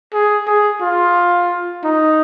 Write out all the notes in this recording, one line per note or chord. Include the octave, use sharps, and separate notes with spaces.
G#4
G#4
F4
D#4